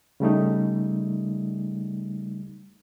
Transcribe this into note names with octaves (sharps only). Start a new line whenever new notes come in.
C#3 G3 A3 D#4